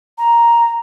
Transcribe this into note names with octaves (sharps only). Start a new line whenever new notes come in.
A#5